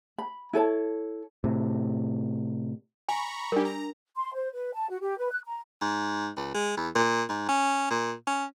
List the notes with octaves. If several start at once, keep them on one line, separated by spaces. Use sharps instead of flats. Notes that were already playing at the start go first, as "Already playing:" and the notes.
B5
E4 A4 C#5 A5
A2 C3
G#5 A#5 B5 C#6
G3 D4 G4 A#4
A#5
C6
C5
B4
A5
F#4
G4
B4
F#6
A#5
G#2
C#2
G#3
E2
A#2
G#2
C#4
A#2
C#4